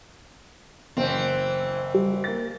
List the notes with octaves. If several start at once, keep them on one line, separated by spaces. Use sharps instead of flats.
F#1 E3 C4
G3
A#3 A6